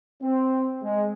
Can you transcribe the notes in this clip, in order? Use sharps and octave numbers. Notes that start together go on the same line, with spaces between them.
C4
G#3